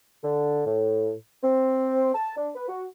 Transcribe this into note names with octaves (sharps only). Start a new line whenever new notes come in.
D3
A2
C4
A5
D4
B4
F#4